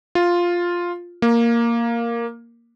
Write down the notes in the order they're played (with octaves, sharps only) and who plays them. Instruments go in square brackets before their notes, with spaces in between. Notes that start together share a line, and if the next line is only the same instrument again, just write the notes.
[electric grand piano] F4
A#3